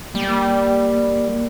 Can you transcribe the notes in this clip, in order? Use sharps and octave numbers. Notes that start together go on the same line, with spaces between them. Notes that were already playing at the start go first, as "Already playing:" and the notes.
G3 A#3